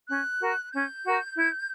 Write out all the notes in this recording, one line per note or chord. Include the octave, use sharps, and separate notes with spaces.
C#4 F#6
F#4 A#4
C#4 G6
F#4 A#4
E4